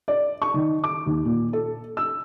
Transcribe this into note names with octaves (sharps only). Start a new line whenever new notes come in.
D5
C#6
D#3
D6
D#2
A#2
A4
E6